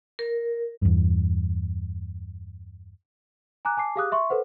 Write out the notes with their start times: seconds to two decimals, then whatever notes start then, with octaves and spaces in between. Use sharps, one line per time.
0.19 A#4
0.82 E2 G2
3.65 G#5 A#5 D6 F#6
3.77 G#5 A5 D6 C7
3.96 G4 G#4 F5 D6 D#6 F#6
4.12 E5 C6 C#6
4.30 A4 B4 C5 F#5